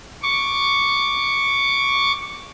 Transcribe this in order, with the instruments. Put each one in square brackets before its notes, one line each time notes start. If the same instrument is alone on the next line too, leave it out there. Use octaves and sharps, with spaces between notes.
[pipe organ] C#6 D6